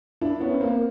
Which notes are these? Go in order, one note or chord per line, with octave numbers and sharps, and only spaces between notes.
D4 E4
B3 C#4
A#3 C4